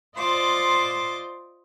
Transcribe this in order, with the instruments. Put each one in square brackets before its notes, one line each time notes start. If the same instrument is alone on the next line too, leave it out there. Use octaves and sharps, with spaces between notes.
[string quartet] F4 C5 D5 D#5 C6 D6